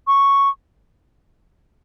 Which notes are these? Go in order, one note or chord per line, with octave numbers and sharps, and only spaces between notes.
C#6